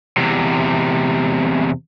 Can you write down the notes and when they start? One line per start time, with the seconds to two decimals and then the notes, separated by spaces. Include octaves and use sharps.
0.17 E2 C3